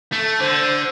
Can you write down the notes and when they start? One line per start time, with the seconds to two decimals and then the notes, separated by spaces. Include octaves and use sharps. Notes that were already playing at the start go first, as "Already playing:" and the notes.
0.12 A3
0.40 D3 C5